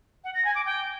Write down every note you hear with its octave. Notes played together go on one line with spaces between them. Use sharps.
F#5
A#6
G#5
D6
G5